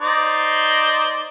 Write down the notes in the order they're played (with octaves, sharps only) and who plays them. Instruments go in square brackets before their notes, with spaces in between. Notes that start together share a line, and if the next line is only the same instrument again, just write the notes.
[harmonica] D#4 C5 D5